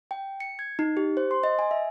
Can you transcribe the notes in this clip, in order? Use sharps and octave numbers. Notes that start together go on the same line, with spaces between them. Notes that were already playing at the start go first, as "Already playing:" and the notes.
G5
C#7
G#6
D#4
G4
C5
C6
D#5
G#5
E5